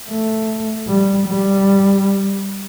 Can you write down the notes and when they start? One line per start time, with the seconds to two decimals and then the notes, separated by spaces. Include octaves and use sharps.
0.09 A3
0.88 G3
1.27 G3